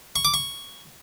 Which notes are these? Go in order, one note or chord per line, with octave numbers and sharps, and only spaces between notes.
C#6
D6
C#6